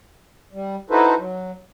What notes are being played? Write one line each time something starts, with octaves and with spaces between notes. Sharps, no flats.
G3
D#4 E4 F#4 A4 B4 C5
F#3